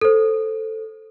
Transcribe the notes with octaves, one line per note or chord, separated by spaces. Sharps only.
A4 C5